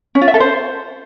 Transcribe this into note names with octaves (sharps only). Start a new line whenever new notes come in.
C#4
F4
E5
A4
C5